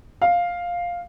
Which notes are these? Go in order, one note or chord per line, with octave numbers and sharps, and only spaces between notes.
F5